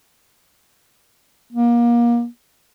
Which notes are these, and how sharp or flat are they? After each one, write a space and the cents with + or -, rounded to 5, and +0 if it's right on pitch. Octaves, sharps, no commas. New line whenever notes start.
A#3 +30